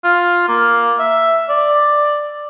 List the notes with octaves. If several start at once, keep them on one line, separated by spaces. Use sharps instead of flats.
F4
A#3
E5
D5